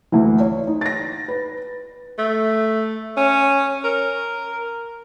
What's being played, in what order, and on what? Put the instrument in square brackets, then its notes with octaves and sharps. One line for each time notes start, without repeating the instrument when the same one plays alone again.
[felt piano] D2 E3
C#5
D#4
A6 A#6
B4
[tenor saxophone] A3
C#4
A#4